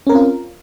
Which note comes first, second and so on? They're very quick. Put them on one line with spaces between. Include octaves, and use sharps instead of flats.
C#4 A#4 C4 F4